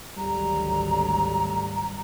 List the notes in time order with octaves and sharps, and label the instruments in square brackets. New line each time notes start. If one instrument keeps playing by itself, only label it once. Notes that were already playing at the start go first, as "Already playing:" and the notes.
[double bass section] G#1 D2 F#3 [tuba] G3 [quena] A#5